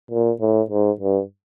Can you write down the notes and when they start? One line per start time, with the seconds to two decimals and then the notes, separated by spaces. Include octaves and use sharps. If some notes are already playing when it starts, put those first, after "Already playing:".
0.11 A#2
0.41 A2
0.70 G#2
1.00 G2